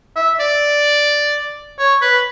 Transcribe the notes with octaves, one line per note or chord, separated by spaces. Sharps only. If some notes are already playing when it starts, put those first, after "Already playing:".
E5
D5
C#5
B4